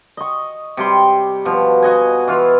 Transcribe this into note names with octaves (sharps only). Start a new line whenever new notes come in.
D#5 C#6
C3 G3 C6
B2 F3
F#4 D#5 G#5
E3 F4